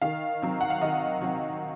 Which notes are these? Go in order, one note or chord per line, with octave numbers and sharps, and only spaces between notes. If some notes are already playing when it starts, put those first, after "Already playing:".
D#3 F5
F#3 C4
F#5
F5
D#3 D#5
F#3 C4